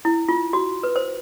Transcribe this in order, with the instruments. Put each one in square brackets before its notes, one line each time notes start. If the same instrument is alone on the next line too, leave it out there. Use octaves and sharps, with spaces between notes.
[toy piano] E4
F4
F#4
B4
C5